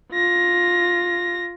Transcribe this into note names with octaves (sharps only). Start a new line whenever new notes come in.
F4 A#6